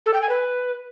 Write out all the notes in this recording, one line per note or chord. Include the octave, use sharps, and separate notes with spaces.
A4
G5
G#5
B4